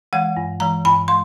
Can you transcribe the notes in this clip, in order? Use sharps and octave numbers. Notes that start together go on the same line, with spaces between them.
E3 G#3 F#5
G2
E3 G#3 A#5
G2 B5
G#3 C6